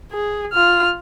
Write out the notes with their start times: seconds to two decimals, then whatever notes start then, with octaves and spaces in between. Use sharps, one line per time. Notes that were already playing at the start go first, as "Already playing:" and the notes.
0.12 G#4
0.53 F4 F6